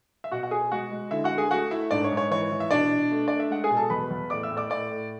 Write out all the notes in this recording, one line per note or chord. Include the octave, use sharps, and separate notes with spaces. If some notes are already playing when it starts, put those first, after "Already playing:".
E5
B2 F#4 F#5
F#5
B2 G#4 G#5
G#3 F#4 F#5
G#3
D3 E4 E5
F#4 F#5
D3
G#4 G#5
A3 F#4 F#5
A3 E4 E5
G#2 D4 D5
C#5
G#2
C#5
E3 C#5
E3
E5
B2 D4 D5
B2
A3
A3 D5
E5
G#3 F#5
G#4 G#5
B2
A4 A5
E2 B4 B5
E2
A2 D5 D6
E5 E6
A2
D5 D6
A2 D5 D6
A2